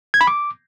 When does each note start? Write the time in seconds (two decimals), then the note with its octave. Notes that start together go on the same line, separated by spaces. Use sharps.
0.14 G#6
0.21 B5
0.27 D6